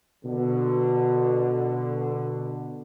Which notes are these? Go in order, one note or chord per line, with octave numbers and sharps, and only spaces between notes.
B2 D3